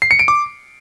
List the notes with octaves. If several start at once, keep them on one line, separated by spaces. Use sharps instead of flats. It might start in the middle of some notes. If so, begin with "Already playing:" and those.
C7
C#7
D7
D6